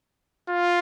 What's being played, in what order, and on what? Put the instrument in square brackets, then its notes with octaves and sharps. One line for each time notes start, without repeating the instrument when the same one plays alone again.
[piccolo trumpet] F4